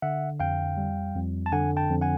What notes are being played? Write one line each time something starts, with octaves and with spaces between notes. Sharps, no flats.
D3 E5 F#5
F2 F5 G5
G3
F2
A5
D3 F#5 G#5
G5 A5
F2
F#5 G#5